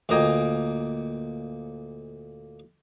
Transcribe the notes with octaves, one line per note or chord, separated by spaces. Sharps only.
D2 A#2 A#3 D#5 G5 G#5